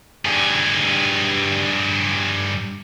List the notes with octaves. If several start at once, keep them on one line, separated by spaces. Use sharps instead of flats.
G2 G#4